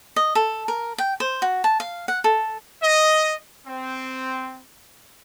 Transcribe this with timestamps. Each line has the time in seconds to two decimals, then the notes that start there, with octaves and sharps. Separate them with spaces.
0.16 D#5
0.35 A4
0.68 A#4
0.98 G5
1.20 C5
1.42 F#4
1.64 A5
1.80 F5
2.08 F#5
2.24 A4
2.83 D#5
3.67 C4